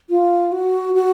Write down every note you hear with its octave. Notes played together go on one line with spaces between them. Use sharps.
F4
F#4
F#4